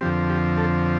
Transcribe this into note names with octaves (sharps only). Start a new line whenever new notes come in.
F2 D3 F3 C4 G4
G4
A4